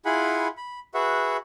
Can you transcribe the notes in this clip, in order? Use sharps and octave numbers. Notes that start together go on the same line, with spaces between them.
E4 F4 G#4 F#5 G#5 B5
B5
F#4 G#4 B4 E5 F#5